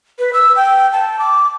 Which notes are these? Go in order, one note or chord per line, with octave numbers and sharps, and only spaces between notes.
B4
E6
G5
A5
D6